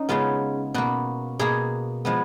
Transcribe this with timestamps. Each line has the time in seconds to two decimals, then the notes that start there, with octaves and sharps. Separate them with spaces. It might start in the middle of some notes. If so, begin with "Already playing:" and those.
Already playing: C#4 D#4
0.09 C#3 G#3 B3 F4
0.74 B2 A#3 F#4
1.39 B2 A#3 G#4
2.05 F3 G#3 B3